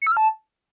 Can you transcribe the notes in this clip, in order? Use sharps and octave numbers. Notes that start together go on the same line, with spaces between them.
C#7
E6
F6
A5